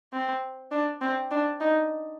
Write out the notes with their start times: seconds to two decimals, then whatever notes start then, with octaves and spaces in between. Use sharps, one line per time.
0.13 C4
0.71 D4
1.01 C4
1.31 D4
1.60 D#4